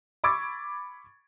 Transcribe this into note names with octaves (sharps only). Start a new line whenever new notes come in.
B5 C#6 D6 E6 G#6 A6